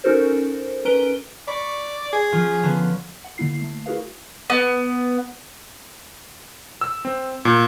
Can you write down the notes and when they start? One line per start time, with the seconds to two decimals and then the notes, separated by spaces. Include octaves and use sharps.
0.04 C#4 D#4 F#4 A4 A#4 C5
0.85 C#4 B4 A#5 D7 G7
1.48 D5 B5 C#6 A#6
2.13 G#4
2.32 F3 C#4 F4
2.63 D3 B3 C#4
3.24 F#5
3.38 D3 A#3 E4 C7
3.62 A3
3.86 E4 F#4 G#4 A#4 B4 F5
4.50 B3
6.81 E6
7.05 C4
7.45 A#2